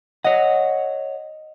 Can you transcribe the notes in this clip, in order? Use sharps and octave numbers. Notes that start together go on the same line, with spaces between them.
C#5 D#5 F#5